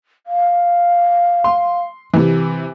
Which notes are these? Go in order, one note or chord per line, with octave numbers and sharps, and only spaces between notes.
F5
C6
C3 E3